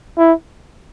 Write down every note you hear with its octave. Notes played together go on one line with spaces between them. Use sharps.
E4